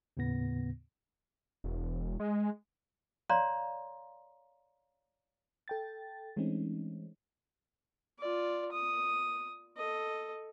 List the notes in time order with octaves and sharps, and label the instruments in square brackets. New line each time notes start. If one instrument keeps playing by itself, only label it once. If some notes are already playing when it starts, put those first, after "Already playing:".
[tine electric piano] D#2 A2 C#3 B3 A#6
[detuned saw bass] E1
G#3
[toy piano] C#5 D5 F5 A#5 C6
[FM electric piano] A4 G5 A6
E3 G#3 A3 C4 C#4 D#4
[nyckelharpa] F4 D5
D#6
A4 D#5